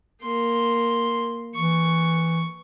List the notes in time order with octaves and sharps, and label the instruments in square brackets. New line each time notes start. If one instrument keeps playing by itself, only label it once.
[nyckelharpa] A#3 C6
[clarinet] E3 [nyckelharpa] C#6